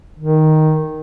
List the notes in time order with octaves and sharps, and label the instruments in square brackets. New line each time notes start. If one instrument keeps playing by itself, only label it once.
[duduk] D#3